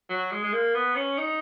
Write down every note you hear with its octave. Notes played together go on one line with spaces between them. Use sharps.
F#3
G#3
G#3
A#3
B3
C#4
D#4